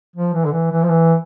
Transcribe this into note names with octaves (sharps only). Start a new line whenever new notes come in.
F3
E3
D3
E3
E3
F3
E3